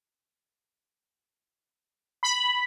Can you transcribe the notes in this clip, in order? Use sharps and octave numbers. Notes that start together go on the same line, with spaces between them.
B5